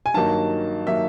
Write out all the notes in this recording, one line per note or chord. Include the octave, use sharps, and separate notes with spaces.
G#5
G2 D#3 F#3 A#3 D#4 A5
D#3 F#3 A#3 D#4 E5